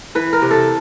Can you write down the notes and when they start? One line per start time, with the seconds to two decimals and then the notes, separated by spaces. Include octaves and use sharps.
0.15 E3 B4
0.33 A#4
0.42 C3
0.51 A4